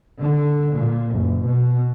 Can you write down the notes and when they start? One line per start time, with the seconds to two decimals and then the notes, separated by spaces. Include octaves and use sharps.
0.19 D3
0.71 A#2
1.13 F#1
1.43 B2